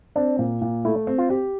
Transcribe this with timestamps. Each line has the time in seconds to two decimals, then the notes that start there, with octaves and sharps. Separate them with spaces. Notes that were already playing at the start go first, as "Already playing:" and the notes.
0.16 C4 D4
0.39 A#2
0.62 A#2
0.85 A3 E4
1.07 C4
1.18 F4
1.30 G4